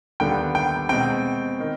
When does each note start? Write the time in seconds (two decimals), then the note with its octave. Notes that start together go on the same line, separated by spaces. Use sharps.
0.20 D#2 D3 G3 B3 G5
0.55 G5
0.89 B2 G#3 C4 G5
1.60 D#3